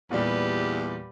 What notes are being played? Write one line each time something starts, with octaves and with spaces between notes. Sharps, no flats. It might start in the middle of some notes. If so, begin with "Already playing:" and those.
E2 A#2 G3 G4 B4